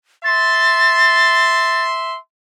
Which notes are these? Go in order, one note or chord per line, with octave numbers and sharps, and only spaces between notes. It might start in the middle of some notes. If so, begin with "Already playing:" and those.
E5 C6 A6